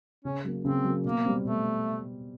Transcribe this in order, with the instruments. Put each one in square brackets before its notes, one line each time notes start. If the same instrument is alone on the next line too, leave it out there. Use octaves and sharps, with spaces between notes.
[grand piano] C#3 [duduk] C#4
[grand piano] F#3 A#3
[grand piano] C#3 [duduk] C4
[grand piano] F#3 A#3
[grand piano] B2 [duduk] A#3
[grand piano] G3 C4
[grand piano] B2 [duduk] A3